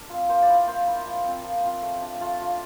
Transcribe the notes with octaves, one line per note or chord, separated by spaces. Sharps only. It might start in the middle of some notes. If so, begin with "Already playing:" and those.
Already playing: D4 A#4
C4 F4
A#3 C5
D5
E4
F5
A#3 C5
E4
F3
C4 F4
F3
C4 F4
A3
D4 F4
A3 F4
D4 F4